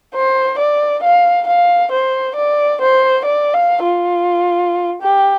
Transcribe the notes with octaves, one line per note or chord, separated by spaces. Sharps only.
C5
D5
F5
F5
C5
D5
C5
D5
F5
F4
G4